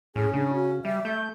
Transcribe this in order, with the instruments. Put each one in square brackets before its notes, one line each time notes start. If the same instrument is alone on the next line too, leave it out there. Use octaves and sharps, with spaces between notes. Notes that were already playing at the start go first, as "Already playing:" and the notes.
[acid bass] A2 [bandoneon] C#4 [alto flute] G#4
[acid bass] C#3 [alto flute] D4
[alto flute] F#4
[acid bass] G3 [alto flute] E5
[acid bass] A3 [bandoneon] G6